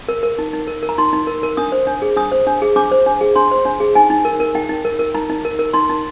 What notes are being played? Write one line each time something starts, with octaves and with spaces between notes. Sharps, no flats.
A#4
A#4
D#4
D#4
A#4
A#4
A#5
D#4 C6
D#4
A#4
A#4
D4 D#6
C5
D4
G#4
D4 D#6
C5
D4
G#4
D4 D6
C5
D4
G#4
D4 C6
C5
D4
G#4
D#4 G#5
D#4
A#4
A#4
D#4 G5
D#4
A#4
A#4
D#4 A#5
D#4
A#4
A#4
D#4 C6
D#4